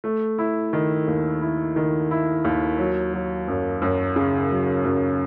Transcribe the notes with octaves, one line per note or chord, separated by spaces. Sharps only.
A3
E4
D#3
D#2
E4
D#3
E4
D#2
F#3
F#3
F#2
F#2
C#3
F#3
F#2